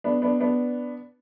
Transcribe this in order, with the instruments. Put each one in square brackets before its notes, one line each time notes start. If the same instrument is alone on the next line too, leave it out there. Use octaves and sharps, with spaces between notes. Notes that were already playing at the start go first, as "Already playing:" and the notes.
[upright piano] B3 D4
B3 D4
B3 D4